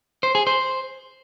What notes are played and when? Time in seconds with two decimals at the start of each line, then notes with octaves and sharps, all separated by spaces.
0.23 C5
0.35 G#4
0.47 C5